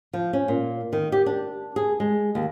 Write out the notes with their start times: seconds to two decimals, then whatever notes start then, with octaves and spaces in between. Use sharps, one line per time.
0.13 F3
0.33 C#4
0.48 A#2
0.93 D#3
1.12 G4
1.26 D4
1.76 G#4
2.00 G#3
2.35 D#2